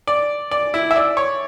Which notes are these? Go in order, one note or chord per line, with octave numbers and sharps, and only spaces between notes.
D5
D5
E4
E5
D5
C#5